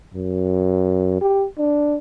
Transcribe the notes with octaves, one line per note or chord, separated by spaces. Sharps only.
F#2
G4
D4